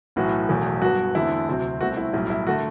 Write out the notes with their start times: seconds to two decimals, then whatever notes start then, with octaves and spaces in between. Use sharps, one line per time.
0.16 B1 A2 E3 B3 F#4
0.49 E1 E2 B2 F#3 A3
0.82 G2 F#3 B3 F#4
1.15 E2 D3 A3 C4 E4
1.48 D2 C3 F#3 C4
1.81 C2 B2 A3 C4 F#4
1.97 E4
2.13 B1 A2 G3 E4
2.30 E4
2.47 D3 A3 F#4